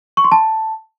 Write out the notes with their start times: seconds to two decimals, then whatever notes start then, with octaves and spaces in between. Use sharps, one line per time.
0.17 C#6
0.24 C6
0.32 A5